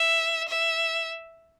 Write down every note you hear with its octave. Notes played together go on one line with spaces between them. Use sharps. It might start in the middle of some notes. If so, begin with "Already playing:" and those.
Already playing: E5
E5